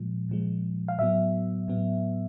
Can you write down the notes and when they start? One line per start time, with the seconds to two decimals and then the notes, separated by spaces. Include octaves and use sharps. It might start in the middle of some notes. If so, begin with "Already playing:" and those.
Already playing: A#2 F3 G#3
0.29 A#2 F3 G#3
0.88 F5
0.98 A2 F#3 B3 E5
1.68 A2 F#3 B3